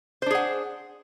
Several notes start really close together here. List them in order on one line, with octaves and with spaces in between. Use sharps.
C5 D4 G#4 F#5